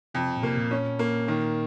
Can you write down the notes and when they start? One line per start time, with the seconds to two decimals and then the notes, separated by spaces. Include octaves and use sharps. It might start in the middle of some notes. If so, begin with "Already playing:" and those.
0.14 F2 C3
0.36 A#2
0.43 C3 A#3
0.57 A#2
0.71 C#4
0.99 A#3
1.28 D#3